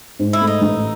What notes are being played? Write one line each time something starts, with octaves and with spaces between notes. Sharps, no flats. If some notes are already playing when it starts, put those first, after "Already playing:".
G#2
E4
A3
D#4
A1